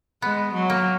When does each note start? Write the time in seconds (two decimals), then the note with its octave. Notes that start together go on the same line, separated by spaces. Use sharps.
0.22 G#3 B3
0.53 F#3
0.70 A#3